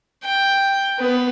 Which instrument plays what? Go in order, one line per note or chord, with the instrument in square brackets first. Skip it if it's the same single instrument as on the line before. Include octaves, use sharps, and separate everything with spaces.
[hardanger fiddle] G5
B3